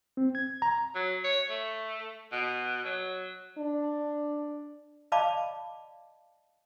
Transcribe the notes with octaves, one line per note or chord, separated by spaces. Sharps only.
C4
G#6
A#5
F#3
C#5
A3
B2
F#3
D4
D5 D#5 F5 A5 B5 D6